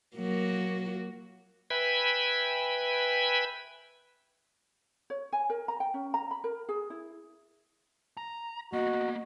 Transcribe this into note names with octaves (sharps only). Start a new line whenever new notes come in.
F#3 A#3 F#4
B4 E5 G5 G#5 B5
C#5
G#5
A#4
A#5
G5
C#4
A#5
B5
A#4
G#4
E4
A#5
A#3 B3 F#4 D#5